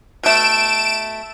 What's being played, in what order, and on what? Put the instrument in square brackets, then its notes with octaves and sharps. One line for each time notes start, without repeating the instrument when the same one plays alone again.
[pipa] B2 A3 [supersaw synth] D7 E7